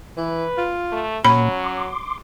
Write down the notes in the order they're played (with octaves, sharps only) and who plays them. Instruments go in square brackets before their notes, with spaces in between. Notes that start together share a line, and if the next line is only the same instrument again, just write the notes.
[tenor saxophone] E3 [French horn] B4
[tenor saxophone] F4
[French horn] A3
[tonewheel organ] A#2 A#3 [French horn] F#3 [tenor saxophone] C#4 [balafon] B5
[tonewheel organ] C6 D6